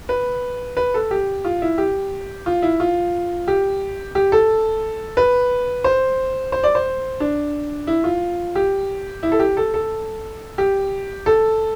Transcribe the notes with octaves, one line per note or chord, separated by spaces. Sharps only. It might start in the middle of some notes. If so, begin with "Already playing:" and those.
B4
B4
A4
G4
F4
E4
G4
F4
E4
F4
G4
G4
A4
B4
C5
C5
D5
C5
D4
E4
F4
G4
E4
A4
G4
A4
A4
G4
A4